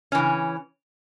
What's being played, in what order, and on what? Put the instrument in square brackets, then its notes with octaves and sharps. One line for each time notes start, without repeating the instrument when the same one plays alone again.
[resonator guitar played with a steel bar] C#4
E3
C#3